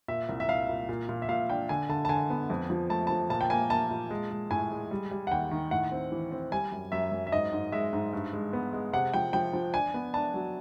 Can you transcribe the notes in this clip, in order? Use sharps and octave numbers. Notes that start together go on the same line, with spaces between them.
A#2 E5
C2
E5
C2 F5
A#2
A#2
A#2
E5
A#2 F5
D4 G5
D3 G#5
D3 A5
A5
D3 G#5
B3
F2
F3
A3 A5
F3 A5
A#2 A5
G5
A#3 G#5
A#3 A5
A#2
G#3
G#3
A2 G#5
G#3
G3
G3
F#5
D#2 G5
D#3
A2 F#5
C4
E3
C4
G3 G#5
F#2
F#2 E5
F#2
E5
G#2 D#5
G#2
G#3 E5
G#2
G2
G#3
B3
G#3
C3 F#5
F3 G5
F3 G5
F3
D4 G#5
B3
D4 A5
F#3